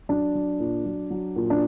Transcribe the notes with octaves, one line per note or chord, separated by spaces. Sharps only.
F#3 D4
F#3
A#2
F#3
F#3
A#2
D4